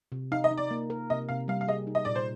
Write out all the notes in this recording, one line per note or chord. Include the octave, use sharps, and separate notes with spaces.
C3
D#4 F5
D#5
D#4
D5
A#3
A#4
C3 D#5
C3 F5
G3 F5
F5
G#4 D#5
D#4
D#5
A#2 D5
C5